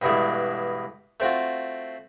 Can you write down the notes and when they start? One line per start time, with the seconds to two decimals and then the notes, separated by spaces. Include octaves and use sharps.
0.02 G2 B2 E3 G#3 A3
1.20 A3 C4 F4 F#4